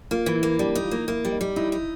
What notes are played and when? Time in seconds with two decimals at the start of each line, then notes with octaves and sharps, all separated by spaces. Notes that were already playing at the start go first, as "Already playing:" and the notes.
0.11 A#3 F4
0.26 E3
0.35 E4
0.43 A#3
0.59 G3 D4
0.75 D#4
0.84 F4
0.91 A#3
1.08 A#3 E4
1.25 G3
1.32 D#4
1.41 G3
1.56 D#4 E4
1.72 D#4